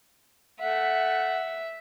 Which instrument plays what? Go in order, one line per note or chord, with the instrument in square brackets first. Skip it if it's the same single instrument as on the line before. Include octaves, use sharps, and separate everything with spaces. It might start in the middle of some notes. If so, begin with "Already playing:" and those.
[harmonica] A3 F#5 [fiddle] E5